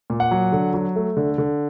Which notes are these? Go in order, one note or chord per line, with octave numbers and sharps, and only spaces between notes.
A#2
F#5
F#3
D3
F#3
A3
D3
D3